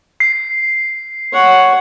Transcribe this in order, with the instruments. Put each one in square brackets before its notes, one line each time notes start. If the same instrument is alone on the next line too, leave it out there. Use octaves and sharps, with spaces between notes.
[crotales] C7
[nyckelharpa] C#5 F#5